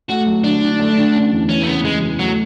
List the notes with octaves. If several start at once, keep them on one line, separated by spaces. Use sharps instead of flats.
A3 F#4
F#3
D3 D4
D3
A3
D3
C#4
E2
E3 C#4
A3
C#3 B3
E2 G#3
E2
F#3 A3